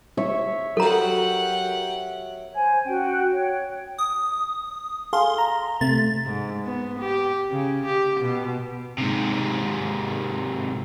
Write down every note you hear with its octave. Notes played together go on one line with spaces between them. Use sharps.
C#5 E5 C#6
F#3 F#4 G4 A4 A#4 F#5 A#5
C5 G#5 G#6
C#4 F#4 G5
C#5 G5
D#6
G#4 A4 F5 C6
A#5
C3 A3 A6
G#2
B3
G4
C#3
G4
B2
G#2 C3